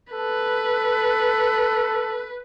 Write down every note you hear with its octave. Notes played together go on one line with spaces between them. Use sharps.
A4 B4